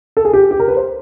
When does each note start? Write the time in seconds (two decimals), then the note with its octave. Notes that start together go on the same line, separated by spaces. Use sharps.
0.17 A4
0.25 G#4
0.33 G4
0.51 G4
0.60 A#4
0.68 B4
0.77 C5